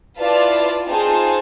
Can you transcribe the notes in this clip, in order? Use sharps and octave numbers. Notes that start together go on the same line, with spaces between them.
E4 F4 B4 D5 F5 A5
C4 D#4 F4 G#4 C5 A5